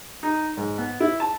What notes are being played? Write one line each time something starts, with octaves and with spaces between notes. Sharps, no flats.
D#4
G#2
B3
E4
A5